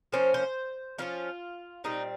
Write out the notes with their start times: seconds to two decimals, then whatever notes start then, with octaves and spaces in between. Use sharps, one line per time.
0.12 F3 A#3 C#4 C5
0.34 C5
0.98 F3 A#3 C#4 F4
1.84 A#2 G3 C4 D#4